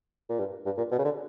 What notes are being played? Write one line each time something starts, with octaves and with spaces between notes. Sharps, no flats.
A#2
G2
G2
A#2
B2
C#3
D3